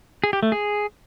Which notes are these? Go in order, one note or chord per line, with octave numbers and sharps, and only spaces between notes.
G#4
G4
A3
G#4